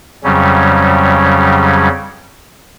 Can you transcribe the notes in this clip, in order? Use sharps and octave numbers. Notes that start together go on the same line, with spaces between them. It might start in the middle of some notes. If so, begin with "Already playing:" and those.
F2 C#3 F#3 G3 C#4